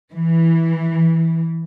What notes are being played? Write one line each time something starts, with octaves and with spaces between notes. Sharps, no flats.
E3